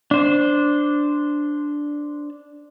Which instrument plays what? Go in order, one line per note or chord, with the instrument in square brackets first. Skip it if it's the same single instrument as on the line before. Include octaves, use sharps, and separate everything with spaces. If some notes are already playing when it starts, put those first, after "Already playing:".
[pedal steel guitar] D4 C5